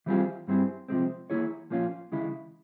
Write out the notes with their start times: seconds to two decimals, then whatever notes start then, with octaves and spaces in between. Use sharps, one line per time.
0.06 E3 G3 C4 F4 G#4
0.47 G2 G3 C4 E4 G#4
0.88 C3 F3 G#3 C4
1.30 E3 A#3 E4 G#4 C#5
1.70 A#2 F3 A#3 C#4 F4
2.12 C#3 E3 G#3 E4